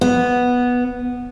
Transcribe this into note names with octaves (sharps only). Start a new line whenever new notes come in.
B3